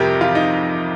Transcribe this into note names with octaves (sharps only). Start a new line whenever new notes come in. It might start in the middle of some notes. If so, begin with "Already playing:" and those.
Already playing: F2 C3 G3 G4 A#4
F4
D#4